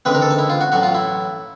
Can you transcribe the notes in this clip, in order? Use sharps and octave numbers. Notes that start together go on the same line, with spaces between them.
D2 C#3 E3 G#3 C4 B4
A#4
A4
D#4
E4
F4
F#4
A1 A2 F#3 F#4
F4
E4